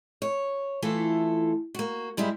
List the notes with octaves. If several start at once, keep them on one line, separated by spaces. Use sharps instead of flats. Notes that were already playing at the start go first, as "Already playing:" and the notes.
C#5
E3 A3 E4 F4 A4
A#3 F#4
G#2 G3 G#3 E4